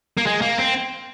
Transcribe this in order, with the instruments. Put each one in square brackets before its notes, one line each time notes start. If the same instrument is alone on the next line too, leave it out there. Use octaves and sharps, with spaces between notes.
[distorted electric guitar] A#3
G#3
A#3
C4